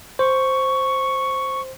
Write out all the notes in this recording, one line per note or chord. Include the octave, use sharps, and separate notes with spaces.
C5 C#6